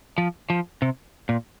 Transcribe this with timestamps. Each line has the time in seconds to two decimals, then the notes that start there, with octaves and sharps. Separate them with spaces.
0.18 F3
0.50 F3
0.82 C3
1.29 A#2